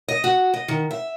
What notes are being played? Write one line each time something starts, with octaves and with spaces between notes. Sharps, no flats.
D#5
F#4
D#5
D#3
E5